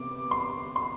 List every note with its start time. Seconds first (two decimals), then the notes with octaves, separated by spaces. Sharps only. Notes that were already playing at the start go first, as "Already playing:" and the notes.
Already playing: C3 B3 D6
0.31 C6
0.76 C6